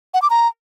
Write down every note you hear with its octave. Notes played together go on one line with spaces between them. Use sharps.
F#5
D6
A#5